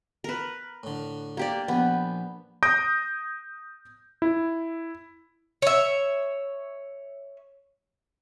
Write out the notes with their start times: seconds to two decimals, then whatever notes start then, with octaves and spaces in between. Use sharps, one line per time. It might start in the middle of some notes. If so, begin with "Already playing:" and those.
0.24 A#4 B4
0.83 A2 D3
1.37 A#3 G4 D5
1.68 A#1 B3
2.63 D#6 G6 A#6 D7
4.22 E4
5.62 C#5 E5